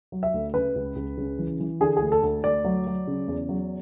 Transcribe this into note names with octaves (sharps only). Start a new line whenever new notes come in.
F#3
E5
D2
C#3 B4
C#2
C#2
C#3
E3
E3
D3 G#4
G#4
D2
A4
D2
D2 D5
F#3
F#3
C#3
E2
F#3